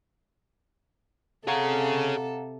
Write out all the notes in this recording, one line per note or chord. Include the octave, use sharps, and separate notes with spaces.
C3 G#4 A4 C#5 F5 F#5 A#5